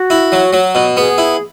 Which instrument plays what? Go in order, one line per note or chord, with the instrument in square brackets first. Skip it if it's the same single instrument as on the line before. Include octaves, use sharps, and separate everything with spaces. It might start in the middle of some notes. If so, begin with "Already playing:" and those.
Already playing: [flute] F#4
[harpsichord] E4
F#3
F#3
B2
[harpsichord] B3 [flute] G#4
[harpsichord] E4